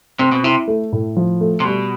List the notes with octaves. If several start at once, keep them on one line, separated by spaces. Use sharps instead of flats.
C3 C4
B2
C3 E4
A3
A2
F3
A3
C3
B2 G3